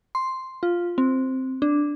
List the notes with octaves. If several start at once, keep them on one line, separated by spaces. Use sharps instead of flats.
C6
F4
C4
D4